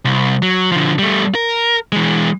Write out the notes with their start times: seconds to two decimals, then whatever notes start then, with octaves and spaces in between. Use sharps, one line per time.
0.05 C2
0.42 F#3
0.72 D3 F3
0.99 G3 A3
1.35 A#4
1.92 E3 G#3